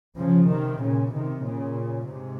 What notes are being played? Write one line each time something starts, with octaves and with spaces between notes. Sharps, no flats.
C#3 F3
C3 D#3
A#2 C#3
C3 D#3
A#2 C#3
G#2 C3